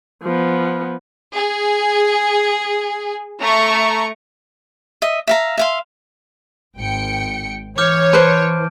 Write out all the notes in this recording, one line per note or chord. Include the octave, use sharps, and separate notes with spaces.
F3 B3
G#4
A3 A#5 C#6
D#5 E5
E5 F5 A#5
E5 F5 C6
G#1 G5 C#7
E3 C#5 D6 F6 G6
B4 C5 A5 G6 D7